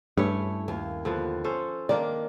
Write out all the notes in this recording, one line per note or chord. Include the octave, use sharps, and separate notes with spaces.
G2 A3 C#4 E4 C#5
D#2 A#3
D3 F3 B3
C#4 A4 C5
D#3 A#3 D4 D5